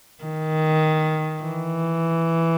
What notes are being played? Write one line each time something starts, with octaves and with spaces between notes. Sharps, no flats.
D#3
E3